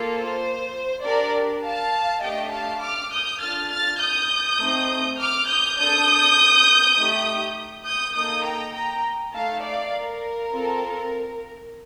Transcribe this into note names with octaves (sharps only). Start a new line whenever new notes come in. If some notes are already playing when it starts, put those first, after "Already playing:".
Already playing: A#3 F4 A4
C5
D4 G4 A#4 D5
F5 A5
A3 D4 G4 D#5 G5
F5 A5
D6 F6
D#6 G6
D4 F4 A4 F6 A6
F6 A6
D#6 G6
A3 C4 D#4
D6 F6
D#6 G6
D4 A4 D#6 G6
A3 D#4 G4
D#6 G6
A#3 D#4 A4 D#6 G6
G5 A#5
G5 A#5
A3 D#4 A4 F5 A5
D5 F5
A#4
C4 F4 A4